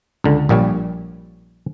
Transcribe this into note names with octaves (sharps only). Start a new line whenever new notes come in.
C#2 D3
A#1 A#2 G3 C#5